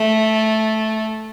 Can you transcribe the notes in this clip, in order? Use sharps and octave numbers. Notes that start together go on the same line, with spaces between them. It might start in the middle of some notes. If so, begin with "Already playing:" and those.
Already playing: A3